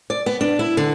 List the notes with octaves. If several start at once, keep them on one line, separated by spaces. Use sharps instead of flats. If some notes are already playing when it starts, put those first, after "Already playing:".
D5
B3
D4
E4
D3